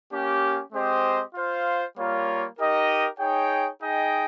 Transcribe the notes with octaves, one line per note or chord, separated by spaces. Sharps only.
A#3 C#4 G4
G#3 C4 G4 C5 D#5
F4 C5 F5
G3 A#3 F4 A#4 C#5
D#4 G4 A#4 D#5
D#4 G#4 C#5 G5
D#4 G#4 D#5 G5